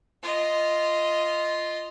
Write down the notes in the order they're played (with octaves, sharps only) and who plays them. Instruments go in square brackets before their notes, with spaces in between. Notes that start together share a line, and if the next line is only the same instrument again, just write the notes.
[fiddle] F4 D#5